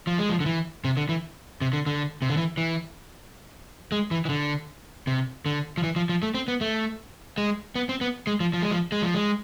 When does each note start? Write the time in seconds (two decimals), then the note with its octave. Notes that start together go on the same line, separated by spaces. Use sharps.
0.07 F3
0.19 G#3
0.29 F3
0.40 D3
0.46 E3
0.85 C3
0.97 D3
1.09 E3
1.61 C3
1.73 D3
1.86 D3
2.22 C3
2.30 D3
2.37 E3
2.57 E3
3.92 G#3
4.11 E3
4.25 E3
4.29 D3
5.07 C3
5.46 D3
5.77 F3
5.84 E3
5.96 F3
6.09 F3
6.23 A3
6.34 C4
6.48 B3
6.61 A3
7.38 G#3
7.75 B3
7.89 C4
8.01 B3
8.27 G#3
8.40 F3
8.53 F3
8.62 G#3
8.71 F3
8.92 G#3
9.02 F3
9.15 G#3